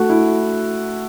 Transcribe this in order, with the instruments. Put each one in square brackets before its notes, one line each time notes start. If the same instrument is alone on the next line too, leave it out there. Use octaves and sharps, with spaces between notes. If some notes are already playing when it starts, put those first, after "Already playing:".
Already playing: [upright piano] A3 F#4
E4